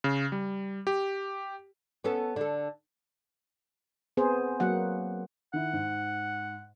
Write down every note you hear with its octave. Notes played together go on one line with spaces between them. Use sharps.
C#3
G3
G4
B3 C#4 A4
D3 A4
B3 C4 G#4 C5
F#3 A#3 F#5
D#3 E4 F#5
G#2